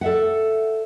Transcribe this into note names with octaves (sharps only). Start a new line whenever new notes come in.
A4 D5 E5 F#5